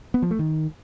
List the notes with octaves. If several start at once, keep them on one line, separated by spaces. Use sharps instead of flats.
B3
F3
A3
D#3